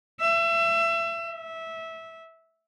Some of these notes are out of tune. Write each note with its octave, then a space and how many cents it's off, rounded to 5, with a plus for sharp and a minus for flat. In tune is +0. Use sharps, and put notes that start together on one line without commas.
E5 +30
E5 -15